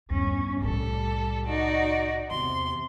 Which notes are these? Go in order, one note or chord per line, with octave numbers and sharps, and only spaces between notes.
E2 G2 C#4
C2 A2 G3 A4
D#4 F#4 D5
E2 C3 C6